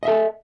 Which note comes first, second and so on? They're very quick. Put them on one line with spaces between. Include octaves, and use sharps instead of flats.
D#5 E5 A4